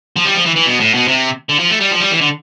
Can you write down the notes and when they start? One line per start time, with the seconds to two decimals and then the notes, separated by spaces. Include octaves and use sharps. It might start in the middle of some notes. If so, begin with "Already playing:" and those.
0.16 F3
0.25 G3
0.35 F3
0.46 E3
0.56 E3
0.66 B2
0.80 A2
0.94 B2
1.08 C3
1.49 D3
1.59 F3
1.70 A3
1.80 G3
1.91 F3
2.00 G3
2.11 E3
2.21 D3